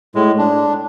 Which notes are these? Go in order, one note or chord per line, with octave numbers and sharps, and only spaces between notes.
A2 G#3
D4